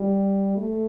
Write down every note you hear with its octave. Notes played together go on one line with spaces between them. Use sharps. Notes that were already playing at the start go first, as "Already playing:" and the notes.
Already playing: G3
A3